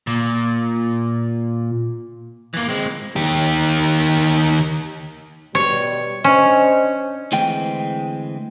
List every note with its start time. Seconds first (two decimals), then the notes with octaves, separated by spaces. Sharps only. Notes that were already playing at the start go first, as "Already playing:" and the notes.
0.07 A#2
2.54 E3 A#3
2.69 G#3 C4
3.16 D#3 G4
5.55 B2 G3 C#5
6.24 C#4 D4 C5 D#5
7.32 D2 E3 G#3 C4 G5